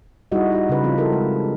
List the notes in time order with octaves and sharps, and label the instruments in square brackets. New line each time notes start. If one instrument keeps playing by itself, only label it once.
[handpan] G3 D#4 E4 F#4 G#4 D#5
D#4 F#4
C#3 B4
F3 C4 F4
E4 F#4 A4 A#4
G#3